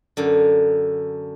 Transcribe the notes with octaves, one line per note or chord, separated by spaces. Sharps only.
F#2 D3